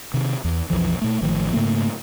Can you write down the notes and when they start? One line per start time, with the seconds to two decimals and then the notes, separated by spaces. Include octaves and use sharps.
0.14 C3 D#3
0.45 E2
0.70 B1 F2 E3 F3
1.02 A#2 A3
1.22 A1 D#3 F3 A3
1.53 G#2 C#3 A3 A#3